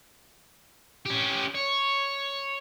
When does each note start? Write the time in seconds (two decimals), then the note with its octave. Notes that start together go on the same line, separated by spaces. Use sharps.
1.06 C#4 G4
1.54 C#5